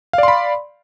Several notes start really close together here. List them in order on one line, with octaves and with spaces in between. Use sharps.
F5 D5 C6 B5